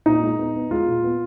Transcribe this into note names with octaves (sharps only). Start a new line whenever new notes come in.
A#2 D#4
G#3
B3
B3
G#3 F4
A#2
B3